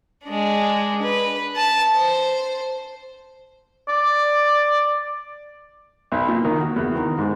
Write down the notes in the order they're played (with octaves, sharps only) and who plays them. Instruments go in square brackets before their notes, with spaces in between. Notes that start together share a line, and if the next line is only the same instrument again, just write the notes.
[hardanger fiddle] G#3 D4
B4
A5
C5
[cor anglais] D5
[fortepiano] B1
A#2
D#3
F#4
E2
D#3
G#2